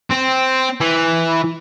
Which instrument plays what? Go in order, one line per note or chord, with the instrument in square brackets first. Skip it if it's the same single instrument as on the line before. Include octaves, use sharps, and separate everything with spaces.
[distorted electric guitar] C4
E3